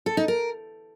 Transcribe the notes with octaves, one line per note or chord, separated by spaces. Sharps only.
A4
D#4
A#4